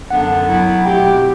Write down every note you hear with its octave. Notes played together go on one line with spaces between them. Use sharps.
F#2 D3 F#3 B3 D4 F#5
F#3 B3 E4
B2 A3 C4 G4 G5